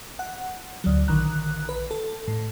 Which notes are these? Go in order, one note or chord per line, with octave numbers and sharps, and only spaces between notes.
F#5
D2 F#3
A#1 D3 D#3 A#5 F#6
B4
A4
A2